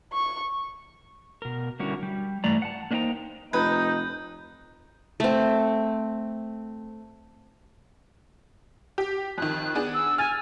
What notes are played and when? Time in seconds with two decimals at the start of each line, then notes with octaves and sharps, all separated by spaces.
0.13 C#6
1.42 B2 A#4
1.80 D3 G3 C#4 E4 F#4 A#4
2.03 G3
2.44 G2 E3 A3 D5 A#5
2.62 F#5 A5
2.91 A#3 D4 D#4 C5 G5 A#5
3.53 F1 D#4 B4 G6 G#6
5.20 A3 C4
8.98 G4
9.38 F2 D#3 F#6
9.75 B3 D4 G#4
9.94 E6
10.18 G#5 F6 A6